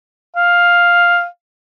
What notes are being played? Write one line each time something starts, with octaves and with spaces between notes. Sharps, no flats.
F5